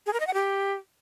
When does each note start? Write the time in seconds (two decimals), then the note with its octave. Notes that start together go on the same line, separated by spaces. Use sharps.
0.06 G#4
0.13 A#4
0.20 D#5
0.27 F#5
0.34 G4